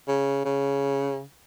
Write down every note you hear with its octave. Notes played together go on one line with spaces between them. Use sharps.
C#3
C#3